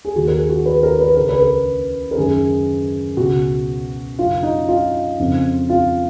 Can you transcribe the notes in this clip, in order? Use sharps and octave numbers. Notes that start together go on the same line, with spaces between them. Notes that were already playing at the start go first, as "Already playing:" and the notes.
G#4
D#2 D#3 F#4
A#4
G#4
F#4
B4
A#4
B4
C#2 C#3 A#4
B4
A#4
A#4
F#2 D#3 G#4
C#2 B2 F#4
F#2 C#3 F4
D#4
F4
F2 C#3
F4